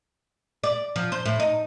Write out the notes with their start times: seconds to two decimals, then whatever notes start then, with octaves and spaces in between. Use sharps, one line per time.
0.64 D5
0.96 F3
1.12 C5
1.26 A2
1.40 D#4